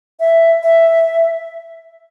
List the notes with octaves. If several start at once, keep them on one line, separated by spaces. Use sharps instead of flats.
E5
E5